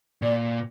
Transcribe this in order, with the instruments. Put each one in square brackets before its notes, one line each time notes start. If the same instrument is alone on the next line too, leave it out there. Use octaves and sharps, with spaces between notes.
[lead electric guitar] A#2 [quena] D5